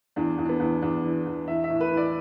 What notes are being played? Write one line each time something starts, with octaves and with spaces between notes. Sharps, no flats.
E2 D4
E2
D4
B3
E2
E2 D4
E3
E2
E3 E5
E5
A2
B4
E3
D5